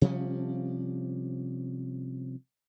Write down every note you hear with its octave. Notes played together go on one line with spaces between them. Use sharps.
C3 F3 G3 C#4